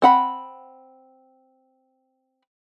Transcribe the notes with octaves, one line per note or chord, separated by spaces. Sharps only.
C4 F#5 B5